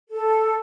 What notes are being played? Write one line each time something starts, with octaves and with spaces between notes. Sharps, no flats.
A4